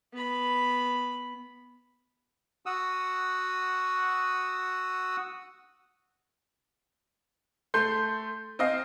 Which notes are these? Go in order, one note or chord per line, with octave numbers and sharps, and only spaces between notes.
B3 B5
F#4 F#5 D#6 E6
A3 C6 G6
C4 D#5 F5